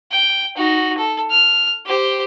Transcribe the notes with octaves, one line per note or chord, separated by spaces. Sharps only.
G5
D#4 F#4
A4
F6
G4 C5